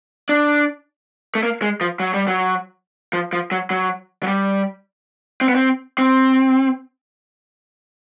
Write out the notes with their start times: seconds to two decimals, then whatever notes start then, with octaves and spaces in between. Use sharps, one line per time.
0.29 D4
1.35 A3
1.43 A#3
1.62 G#3
1.81 F3
2.00 F#3
2.14 G3
2.27 F#3
3.13 F3
3.33 F3
3.52 F#3
3.70 F#3
4.23 F#3
4.27 G3
5.41 C4
5.48 B3
5.55 C4
5.98 C4